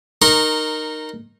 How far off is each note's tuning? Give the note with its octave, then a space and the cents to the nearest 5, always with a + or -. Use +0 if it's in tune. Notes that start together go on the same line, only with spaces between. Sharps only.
D#4 -15 A#4 +0 C#6 -35